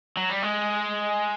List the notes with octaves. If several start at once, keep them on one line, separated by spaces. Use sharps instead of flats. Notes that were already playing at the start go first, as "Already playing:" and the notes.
F#3
G3
G#3